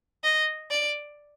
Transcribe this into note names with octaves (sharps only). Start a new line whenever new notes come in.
D#5
D5